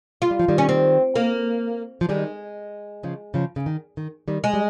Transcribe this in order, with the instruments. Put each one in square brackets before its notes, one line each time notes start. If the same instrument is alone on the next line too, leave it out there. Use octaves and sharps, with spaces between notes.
[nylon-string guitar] G#3 [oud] F4
[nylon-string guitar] G3
F3
D#3 G3
[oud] C#4
C4
A#3
[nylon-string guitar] F3
[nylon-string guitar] D#3 G3 [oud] G#3
[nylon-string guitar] C#3 F3
C#3 F3
C#3
D#3
D#3
D#3 G3
[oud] G#3
[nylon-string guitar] G3